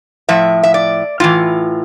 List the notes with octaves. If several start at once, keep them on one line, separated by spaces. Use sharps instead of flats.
A2 F3 E5
E5
D5
A2 E3 F4